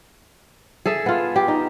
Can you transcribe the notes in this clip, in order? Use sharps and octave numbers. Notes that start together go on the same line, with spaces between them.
G#4 A4 E5
B3 F4
G4
D#4